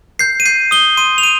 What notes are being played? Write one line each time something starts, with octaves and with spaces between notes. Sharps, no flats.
G6 C7
D#7
G6 C7
D#6 G7
C6 D#7
F7
C6 D#7